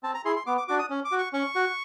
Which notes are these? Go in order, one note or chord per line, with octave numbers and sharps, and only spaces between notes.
C4 A5
A#5
E4 G#4 C6
C6
B3 D6
D6
D4 F#4 D6
D#6
C#4
D6
F#4
C#6
C#4 C#6
F#4